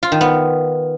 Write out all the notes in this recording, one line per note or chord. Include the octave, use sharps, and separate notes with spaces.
F4
D#3
B3